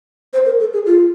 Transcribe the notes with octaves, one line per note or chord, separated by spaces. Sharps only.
C5
A#4
A4
G#4
F4